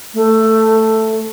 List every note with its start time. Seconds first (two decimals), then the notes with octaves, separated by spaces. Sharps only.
0.14 A3